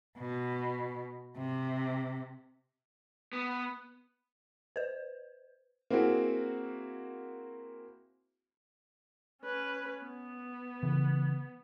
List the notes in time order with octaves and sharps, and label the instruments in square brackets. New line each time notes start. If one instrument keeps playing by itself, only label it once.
[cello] B2
C3
[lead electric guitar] B3
[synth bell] B4 C5
[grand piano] A#3 C4 E4 F#4 G#4
[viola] C#4 B4
B3
[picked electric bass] C#3 E3